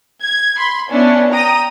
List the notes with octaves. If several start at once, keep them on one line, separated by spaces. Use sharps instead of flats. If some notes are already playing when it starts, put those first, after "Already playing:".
G#6
B5 C6
B3 C#4 D4 E4
G5 A#5 D#6